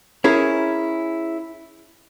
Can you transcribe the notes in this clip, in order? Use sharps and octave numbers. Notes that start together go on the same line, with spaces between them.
C#4 E4 G#4 A#4